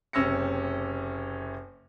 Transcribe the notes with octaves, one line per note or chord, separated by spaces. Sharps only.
F#1 C3 C#4 E6 A#6 C#7